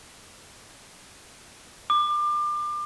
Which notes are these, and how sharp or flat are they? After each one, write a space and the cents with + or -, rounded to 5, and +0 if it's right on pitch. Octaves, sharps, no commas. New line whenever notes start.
D6 +30